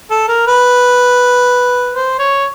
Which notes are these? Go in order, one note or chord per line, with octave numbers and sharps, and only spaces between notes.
A4
A#4
B4
C5
C#5